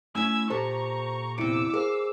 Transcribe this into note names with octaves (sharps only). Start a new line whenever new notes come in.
A3 C#4 E4 G#5 E6 G#6
A#2 G4 A4 C5 A5 A#5 C#6
E2 C3 E4 D6 E6 C#7 D7
G#4 A#4 C5 F5